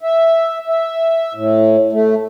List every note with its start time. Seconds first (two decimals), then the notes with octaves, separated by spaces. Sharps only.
0.01 E5
0.68 E5
1.35 A2
1.92 A3